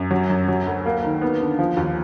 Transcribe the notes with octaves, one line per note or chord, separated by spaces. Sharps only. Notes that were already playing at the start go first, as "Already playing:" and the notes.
Already playing: F#2
F#3
F#2
F#3
D2
A#3
D#3
B3
D3
F3
D#2